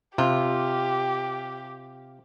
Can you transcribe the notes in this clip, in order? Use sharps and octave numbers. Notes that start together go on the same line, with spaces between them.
C3 F4 G4